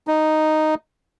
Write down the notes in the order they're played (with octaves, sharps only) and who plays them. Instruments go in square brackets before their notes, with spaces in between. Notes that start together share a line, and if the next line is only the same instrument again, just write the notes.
[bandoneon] D#4